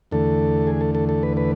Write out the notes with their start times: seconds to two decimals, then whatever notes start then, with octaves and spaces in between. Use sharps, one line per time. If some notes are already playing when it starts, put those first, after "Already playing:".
0.11 E2 D3 A3 A4
0.67 G#4
0.81 A4
0.95 A4
1.09 A4
1.23 B4
1.37 B4